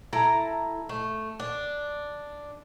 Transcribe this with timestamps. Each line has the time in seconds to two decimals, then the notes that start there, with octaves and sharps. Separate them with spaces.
0.13 E4 A4 A#5
0.89 A3
1.40 D4